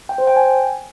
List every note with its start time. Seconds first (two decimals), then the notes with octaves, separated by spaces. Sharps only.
0.09 G5
0.18 C5
0.27 G5
0.36 G#5